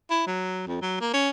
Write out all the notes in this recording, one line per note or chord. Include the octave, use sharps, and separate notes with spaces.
E4
F#3
F2
F#3
A#3
C#4